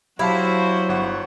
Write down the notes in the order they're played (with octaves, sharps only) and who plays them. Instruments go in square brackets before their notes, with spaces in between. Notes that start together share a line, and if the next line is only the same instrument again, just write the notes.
[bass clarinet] F#3 [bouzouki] E4 [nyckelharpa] F#4 C5 [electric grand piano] G4 F5 A5
[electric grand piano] G1 F#5 C#6